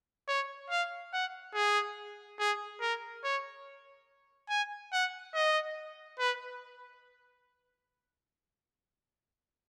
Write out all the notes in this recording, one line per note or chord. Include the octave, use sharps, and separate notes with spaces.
C#5
F5
F#5
G#4
G#4
A#4
C#5
G#5
F#5
D#5
B4